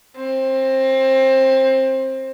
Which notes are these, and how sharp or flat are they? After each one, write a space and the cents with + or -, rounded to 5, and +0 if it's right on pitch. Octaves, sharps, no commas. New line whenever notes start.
C4 +20